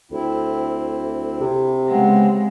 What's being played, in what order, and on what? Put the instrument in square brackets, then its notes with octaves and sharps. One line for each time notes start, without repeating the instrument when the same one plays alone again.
[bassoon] D2 [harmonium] C4 E4
[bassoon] C3
[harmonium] C#3 B3 C4 [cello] G#3